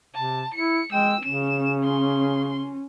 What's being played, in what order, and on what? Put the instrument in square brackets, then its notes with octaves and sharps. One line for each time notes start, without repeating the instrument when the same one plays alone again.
[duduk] C3 [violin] A5
[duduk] E4 [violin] C#7
[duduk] G#3 [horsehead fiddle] G5 [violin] E6
[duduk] C#3 [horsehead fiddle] C#4 [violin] E7
[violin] C6